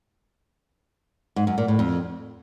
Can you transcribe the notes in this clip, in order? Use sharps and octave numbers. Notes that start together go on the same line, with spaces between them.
G#2
F#2
A#2
A2
F2